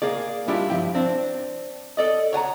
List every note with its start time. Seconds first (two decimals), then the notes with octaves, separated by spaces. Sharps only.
0.02 A#3 G#4 D5
0.48 G3 D4 E4 F4 G4
0.70 G2 F3 E4 G5
0.95 C4 D4
1.97 A4 D5 D#5
2.33 C#5 F#5 G#5 A#5